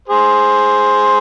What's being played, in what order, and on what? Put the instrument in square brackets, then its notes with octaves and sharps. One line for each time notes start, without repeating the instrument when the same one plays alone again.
[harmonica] G#4 C5